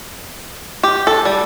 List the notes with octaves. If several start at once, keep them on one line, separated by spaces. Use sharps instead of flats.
G4
A4
G3